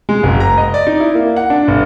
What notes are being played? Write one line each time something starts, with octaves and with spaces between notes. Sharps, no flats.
G#3
F#1
A#5
D#5
D5
D#4
E4
A#3
F#5
D4
G1